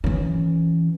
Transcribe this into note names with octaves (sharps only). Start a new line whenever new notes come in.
E3 C#4